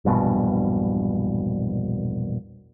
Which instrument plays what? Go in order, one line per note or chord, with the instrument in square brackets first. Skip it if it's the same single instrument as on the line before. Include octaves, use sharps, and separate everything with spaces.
[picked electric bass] E1 A#1 G2 B2